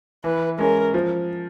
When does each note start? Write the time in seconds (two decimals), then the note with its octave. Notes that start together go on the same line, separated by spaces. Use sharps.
0.24 E3 B4
0.58 G#3 C#4 A#4
0.94 F3